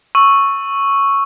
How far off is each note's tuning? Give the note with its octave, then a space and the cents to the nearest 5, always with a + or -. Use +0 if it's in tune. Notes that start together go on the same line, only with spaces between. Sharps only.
C#6 +0 E6 +0